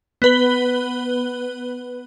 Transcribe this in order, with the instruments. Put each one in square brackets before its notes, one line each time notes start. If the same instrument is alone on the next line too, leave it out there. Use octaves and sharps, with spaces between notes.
[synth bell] B3 B4 G7